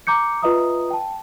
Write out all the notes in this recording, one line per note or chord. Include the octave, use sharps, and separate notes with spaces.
A#5 D6 G6 C#7
F4 B4 D#5 E5 A#5 D#6
G5 A5